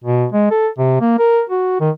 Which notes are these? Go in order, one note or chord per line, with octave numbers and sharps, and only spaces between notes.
B2
G#3
A4
C3
A#3
A#4
F#4
D#3